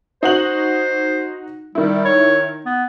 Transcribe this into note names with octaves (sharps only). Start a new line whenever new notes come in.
D#4 F#4 C5 F#7
D#3 G3 E4
C#5
B3